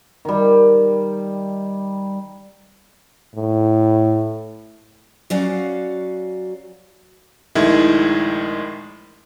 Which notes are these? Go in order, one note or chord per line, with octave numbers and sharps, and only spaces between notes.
D#3 G3
A2
F#3 C#4 F#4 D5 F5 F#5
A#1 D#3 G#3 A3 E4